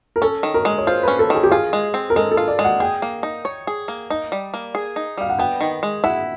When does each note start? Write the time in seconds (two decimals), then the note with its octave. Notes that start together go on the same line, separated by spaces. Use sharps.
0.16 A#4
0.22 C#4 A4
0.43 D#3
0.54 A#4
0.65 G#3
0.78 C#5
0.87 F4 C5
1.03 B4
1.08 C#4
1.19 A4
1.30 D#3 G#4
1.43 G4
1.51 F4 G#4
1.73 G#3
1.94 C4
2.10 A#4
2.16 G#3 A4
2.31 A4
2.37 F4
2.48 D5
2.59 G#3
2.64 F#5
2.80 G#4 G5
3.02 A#3
3.23 D#4
3.45 C#5
3.67 G#4
3.88 A#3
4.10 D#4
4.32 G3
4.54 A#3
4.75 G#4
4.96 D#4
5.17 G3 F5
5.30 F#5
5.39 B3 G5
5.61 D#3
5.83 G#3
6.04 E4 F#5